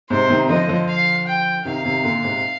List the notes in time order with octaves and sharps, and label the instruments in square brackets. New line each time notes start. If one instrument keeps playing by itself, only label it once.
[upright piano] G#2 C3 [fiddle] C5
[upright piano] C3 D#3
[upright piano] D3 F3 [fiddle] D#5
[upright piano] D3 F3
[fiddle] F5
G5
[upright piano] C3 D#3 [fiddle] F5
[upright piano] C3 D#3
A#2 D3
G#2 C3